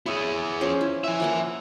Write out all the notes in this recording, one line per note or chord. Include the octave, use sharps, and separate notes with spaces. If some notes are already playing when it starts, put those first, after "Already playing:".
E4 G#4 C#5 D#5
F3 C#4 C5
E4 B4
E5 G#5
F3 A#3 F#5